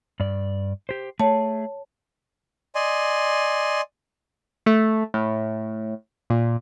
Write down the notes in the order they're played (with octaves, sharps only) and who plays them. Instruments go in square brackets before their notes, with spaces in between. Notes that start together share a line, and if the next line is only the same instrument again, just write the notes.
[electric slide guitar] G2 D5
G4 C5
[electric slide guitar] A3 G#4 [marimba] C#5 A5
[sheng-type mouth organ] D5 D#5 G#5 C6
[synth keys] A3
A2
A#2